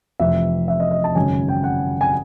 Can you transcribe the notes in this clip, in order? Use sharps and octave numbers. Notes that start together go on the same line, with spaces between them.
F1 F2 C3 E3 E5
E5
D#5
D#5
A5
G#1 F#2 C#3 G#5
G5
F#5
G#5